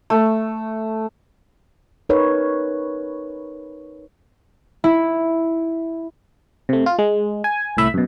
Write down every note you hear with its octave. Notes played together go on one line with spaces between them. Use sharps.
A3
D#4 A#4 B4 C#5
E4
C3 A3
F4
G#3
G#5
C2 A2 E5 B5
F#2 B2